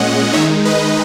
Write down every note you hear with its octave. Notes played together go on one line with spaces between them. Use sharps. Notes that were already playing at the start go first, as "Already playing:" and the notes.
Already playing: A#2 G#3 C#4 D#5 F#5
D#3 G#3 D#4 C#5 E5
B4 D#5